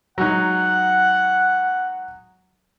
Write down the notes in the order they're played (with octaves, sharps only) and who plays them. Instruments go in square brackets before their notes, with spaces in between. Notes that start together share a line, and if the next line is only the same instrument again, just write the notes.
[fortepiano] F#3 G#3 D#4 [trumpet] F#5